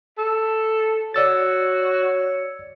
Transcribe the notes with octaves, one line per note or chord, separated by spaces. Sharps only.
A4
F#4 C#5 D5 E6 A6